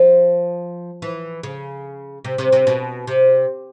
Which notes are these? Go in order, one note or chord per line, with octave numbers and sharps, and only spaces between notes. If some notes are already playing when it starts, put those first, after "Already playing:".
Already playing: F3
E3
C#3
C3
C3
C3
B2
C3